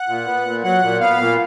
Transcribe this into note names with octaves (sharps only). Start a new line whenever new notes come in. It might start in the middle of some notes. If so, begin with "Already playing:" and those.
Already playing: F#5
A#2
B3
A#2
F#3 F#5
A#2
B3 F5
A#2